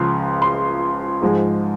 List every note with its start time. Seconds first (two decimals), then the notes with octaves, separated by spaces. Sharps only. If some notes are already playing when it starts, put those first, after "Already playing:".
Already playing: C#2 C#3 F3 C6
0.42 C6
1.22 G#2 F3 G#3